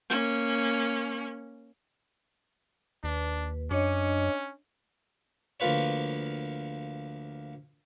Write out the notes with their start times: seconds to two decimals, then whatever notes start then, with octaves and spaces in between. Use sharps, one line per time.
0.10 A#3 C#4
3.04 D#2 D4 B4
3.71 F#2 C#4 D4 C#5 D#5
5.60 D2 F3 A#3 F4 B4 C#5